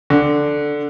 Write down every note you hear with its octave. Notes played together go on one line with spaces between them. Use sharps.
D3